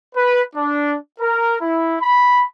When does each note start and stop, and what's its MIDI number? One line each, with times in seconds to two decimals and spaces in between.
0.14 0.41 71
0.54 0.96 62
1.19 1.55 70
1.60 1.95 64
2.01 2.45 83